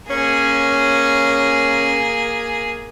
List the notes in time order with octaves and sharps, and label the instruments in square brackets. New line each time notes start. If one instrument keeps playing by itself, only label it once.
[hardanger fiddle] A#3 G#4 [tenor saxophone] C#4